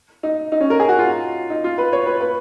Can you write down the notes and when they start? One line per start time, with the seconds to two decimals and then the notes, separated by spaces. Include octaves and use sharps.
0.23 D#4
0.52 D#4
0.60 C#4
0.70 A#4
0.80 G#4
0.89 F#4
0.98 F4
1.50 D#4
1.64 F4
1.78 B4
1.93 C#5
2.06 B4
2.21 B4